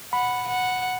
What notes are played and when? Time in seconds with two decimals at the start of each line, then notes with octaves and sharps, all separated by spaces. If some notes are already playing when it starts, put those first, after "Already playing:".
0.12 F#5 B5
0.48 F#5